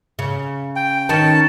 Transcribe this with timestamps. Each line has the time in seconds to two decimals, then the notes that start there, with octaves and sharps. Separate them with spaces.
0.19 C#3
0.76 G5
1.09 D#3 C#4 B4 A5